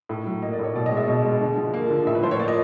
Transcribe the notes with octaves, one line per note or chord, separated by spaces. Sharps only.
A2
F#3
A#3 D#5
D5
A2 C#5
B2 D5
D#5
G#3
E5
B2 D#5
G#3
D3
F3
A#3
D3
A2 E5
B4
F3 C5
C#5
A#3 D5
D#5